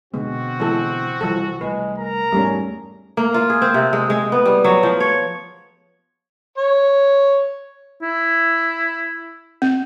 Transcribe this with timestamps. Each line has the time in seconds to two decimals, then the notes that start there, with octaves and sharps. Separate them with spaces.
0.14 B2 D3 G#3 B3 C4 F#4
0.60 E3 G#3 A4
1.21 C2 E3 F3 A4
1.61 C2 G#3 A3 B4
1.99 A#4 A#5
2.32 E2 G#2 G3 A3 C#4
3.17 A#3
3.34 F4
3.50 G#4
3.62 C4
3.74 C3
3.93 G#3
4.10 G#3
4.32 B3
4.45 G3
4.64 F#3
4.83 F3
5.00 C#5
6.58 C#5
8.02 E4
9.62 C4